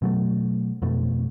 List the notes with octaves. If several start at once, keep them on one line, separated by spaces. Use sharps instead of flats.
B2 F#3 A3
F2 B2 A3